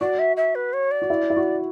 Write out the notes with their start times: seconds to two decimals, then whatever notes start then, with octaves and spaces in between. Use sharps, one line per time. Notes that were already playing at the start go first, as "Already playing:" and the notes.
0.01 F#4 D5
0.19 E5
0.37 E5
0.55 B4
0.73 C#5
0.91 D5
1.02 F#4
1.10 E4
1.30 E4
1.37 F#4